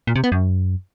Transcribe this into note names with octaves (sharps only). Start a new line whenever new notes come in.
A#2
C3
B3
F#2